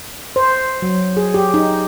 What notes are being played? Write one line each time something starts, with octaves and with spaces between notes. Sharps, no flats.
C5
F#3
G#4
G4
D#4